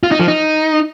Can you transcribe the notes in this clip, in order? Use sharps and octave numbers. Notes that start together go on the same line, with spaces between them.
F4
D#4
F3
D#4